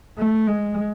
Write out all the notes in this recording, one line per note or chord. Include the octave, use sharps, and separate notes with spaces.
A3
G#3